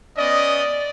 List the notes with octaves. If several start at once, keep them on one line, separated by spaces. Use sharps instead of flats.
B3 C#4 D5 D#5